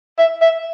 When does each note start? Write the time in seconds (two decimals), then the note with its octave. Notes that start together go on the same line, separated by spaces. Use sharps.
0.18 E5
0.41 E5